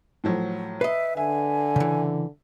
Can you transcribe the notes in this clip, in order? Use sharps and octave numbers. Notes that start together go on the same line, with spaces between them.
A2 F3 F#3
B4 D#5 E5 C7
D3 E5 G#5
C#3 E3